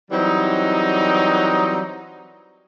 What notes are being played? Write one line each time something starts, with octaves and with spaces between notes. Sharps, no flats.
E3 F#3 G3 C4 D#4